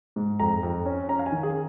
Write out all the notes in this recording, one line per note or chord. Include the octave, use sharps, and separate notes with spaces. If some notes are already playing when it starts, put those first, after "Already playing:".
G#2
F2 A#5
F2
C#4
C#4 A#5
F5
G#5
D#3
G#4